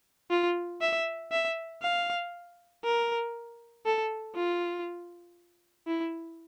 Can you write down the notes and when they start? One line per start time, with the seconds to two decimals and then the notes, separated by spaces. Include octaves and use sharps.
0.30 F4
0.81 E5
1.32 E5
1.82 F5
2.84 A#4
3.85 A4
4.36 F4
5.87 E4